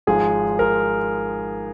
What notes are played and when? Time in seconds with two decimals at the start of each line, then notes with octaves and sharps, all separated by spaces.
0.07 G#1 G#2 F3 G#4
0.59 A#4